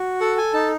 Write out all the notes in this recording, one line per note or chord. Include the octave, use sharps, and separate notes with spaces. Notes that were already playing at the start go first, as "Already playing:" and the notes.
Already playing: F#4
A4 F#5
G#5
D#4 A5